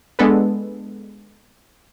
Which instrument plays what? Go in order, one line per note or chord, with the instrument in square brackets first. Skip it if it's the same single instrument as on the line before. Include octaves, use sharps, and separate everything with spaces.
[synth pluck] G#3 B3 D4 A4 B4